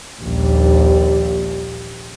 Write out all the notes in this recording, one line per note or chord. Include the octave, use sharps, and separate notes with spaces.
A#1 D#2 G3